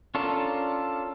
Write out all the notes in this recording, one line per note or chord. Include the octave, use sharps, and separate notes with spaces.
C#4 D4 F4 A4 A#4